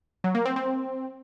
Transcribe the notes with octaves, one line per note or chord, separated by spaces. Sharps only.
F#3
A#3
C4
C4